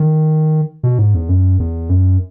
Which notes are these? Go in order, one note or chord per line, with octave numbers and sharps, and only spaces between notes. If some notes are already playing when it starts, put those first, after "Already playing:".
Already playing: D#3
B2
G#2
E2
F#2
E2
F#2